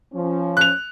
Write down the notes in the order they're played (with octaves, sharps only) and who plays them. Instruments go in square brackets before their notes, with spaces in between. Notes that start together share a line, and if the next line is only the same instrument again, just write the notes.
[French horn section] F3 C#4
[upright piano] F#6 F7